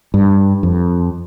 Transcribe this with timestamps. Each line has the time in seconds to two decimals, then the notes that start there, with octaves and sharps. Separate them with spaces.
0.14 G2
0.63 F2